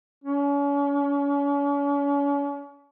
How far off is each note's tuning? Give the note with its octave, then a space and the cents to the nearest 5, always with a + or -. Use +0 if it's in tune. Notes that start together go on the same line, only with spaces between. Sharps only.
C#4 +40